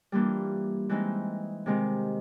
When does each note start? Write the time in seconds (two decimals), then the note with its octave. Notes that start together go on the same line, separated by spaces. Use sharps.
0.12 E3 G3 A#3 D4 F4
0.89 E3 G#3 C4 D#4
1.66 C3 D#3 G#3 C4